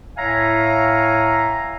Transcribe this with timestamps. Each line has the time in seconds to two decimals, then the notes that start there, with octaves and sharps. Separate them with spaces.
0.18 A2 C#5 E5 F5 G#5 A#5